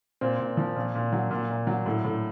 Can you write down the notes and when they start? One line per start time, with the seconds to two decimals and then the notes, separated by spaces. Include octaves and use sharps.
0.21 A#2 C4
0.40 A#2
0.57 F3
0.76 A#2
0.95 A#2
1.12 F#3
1.31 A#2
1.50 A#2
1.67 F#3
1.86 A2
2.05 A2